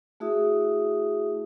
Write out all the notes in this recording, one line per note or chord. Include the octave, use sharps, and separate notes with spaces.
A3 E4 F#4 G#4 E5 D#6